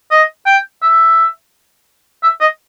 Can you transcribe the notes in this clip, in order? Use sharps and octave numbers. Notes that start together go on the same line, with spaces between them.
D#5
G5
E5
E5
D#5